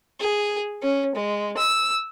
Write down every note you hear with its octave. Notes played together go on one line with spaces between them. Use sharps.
G#4
C#4
G#3
E6